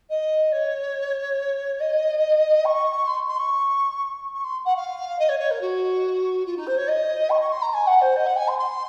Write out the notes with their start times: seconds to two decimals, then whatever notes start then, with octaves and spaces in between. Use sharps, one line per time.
0.10 D#5
0.52 C#5
1.80 D#5
2.65 C#6
3.07 C6
3.27 C6
3.39 C#6
4.34 C#6
4.44 C6
4.65 F#5
4.76 F5
5.19 D#5
5.29 C#5
5.39 C#5
5.51 A#4
5.61 F#4
6.46 F4
6.57 D#4
6.67 C5
6.77 C#5
6.88 D#5
7.30 C#6
7.41 C#6
7.52 C6
7.62 A#5
7.74 G#5
7.87 F#5
8.01 C5
8.16 D#5
8.26 F#5
8.36 G#5
8.48 C6
8.58 C6